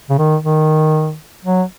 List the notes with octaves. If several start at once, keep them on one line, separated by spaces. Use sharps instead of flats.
C#3
D#3
D#3
F#3